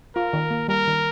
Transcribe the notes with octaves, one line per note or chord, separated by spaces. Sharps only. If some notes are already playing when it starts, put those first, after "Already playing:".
F4 A#4
D#3
A#3
G3 A#4
D#3